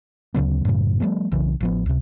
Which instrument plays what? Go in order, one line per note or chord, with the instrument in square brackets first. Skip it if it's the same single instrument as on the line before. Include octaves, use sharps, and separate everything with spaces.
[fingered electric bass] D2 C#3 F#3 B3
F#2 A2 C#3
F3 G3 A3 B3
B1 C#3 E3 C#4
A1 F3 B3
C#2 C3